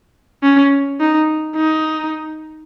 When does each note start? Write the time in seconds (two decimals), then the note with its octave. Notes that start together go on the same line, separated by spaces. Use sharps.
0.43 C#4
1.00 D#4
1.56 D#4